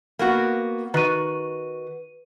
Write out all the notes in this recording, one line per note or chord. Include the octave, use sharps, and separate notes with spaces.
A#3 B3 F#4
D#3 F#4 B4 D#7